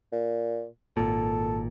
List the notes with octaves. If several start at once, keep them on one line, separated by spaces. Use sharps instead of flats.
A#2
G#1 A#2 A4